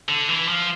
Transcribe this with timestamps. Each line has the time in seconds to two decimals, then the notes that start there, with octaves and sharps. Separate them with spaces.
0.09 D3
0.29 E3
0.49 F3